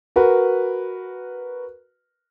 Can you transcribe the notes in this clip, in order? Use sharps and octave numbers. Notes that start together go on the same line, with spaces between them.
F#4 A#4 B4